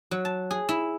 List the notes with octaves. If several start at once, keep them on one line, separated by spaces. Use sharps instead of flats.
F#3
A5
G#4
E4